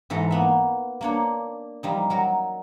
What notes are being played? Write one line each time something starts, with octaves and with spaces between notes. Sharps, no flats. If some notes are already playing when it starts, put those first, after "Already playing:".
G#2 E3 A4 A#5
A#3 B3 E5
A#3 D4 C#5
F3 G3 D#4
F#3 A#4